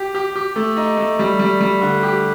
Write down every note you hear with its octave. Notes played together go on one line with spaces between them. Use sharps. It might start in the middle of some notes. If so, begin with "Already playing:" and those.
Already playing: G4
G4
G4
A3
D#4
A3
G3
G3
G3
D3
G4